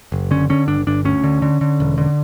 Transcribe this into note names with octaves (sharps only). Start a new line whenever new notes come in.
F#1
D3 C#4
D3 C#4
G1 D4
G1 D4
D2 C#4
D3
D3
D3
E1
D3